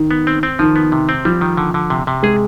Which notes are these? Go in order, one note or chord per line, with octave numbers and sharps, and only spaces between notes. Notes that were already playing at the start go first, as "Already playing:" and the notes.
Already playing: D#3
B3
C4
C4
D#3 F3
B3
C3
C4
F3 G3
D#3
D3
D3
C3
C3
G#3 G#4